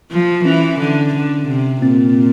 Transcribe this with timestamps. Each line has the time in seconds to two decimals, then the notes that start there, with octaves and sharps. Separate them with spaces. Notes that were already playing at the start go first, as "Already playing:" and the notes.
0.11 F3
0.45 E3 C#4
0.80 D3
1.14 D3
1.49 C3
1.82 A#2 C4